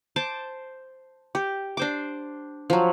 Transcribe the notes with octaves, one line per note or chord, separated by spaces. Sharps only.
C5 A5 D6
G4
D4 C5 D6
F3 F#3